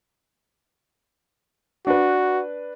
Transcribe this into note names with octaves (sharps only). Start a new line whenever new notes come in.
D4 F#4 B4